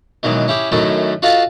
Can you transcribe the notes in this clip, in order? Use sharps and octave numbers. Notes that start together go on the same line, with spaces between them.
B2 D#3 E3 F#3 G#3
C#4 E4 G4 G#4
F#2 D#3 F#3 A3 C#4 E4
F4 F#4 A4 D#5 F5 A5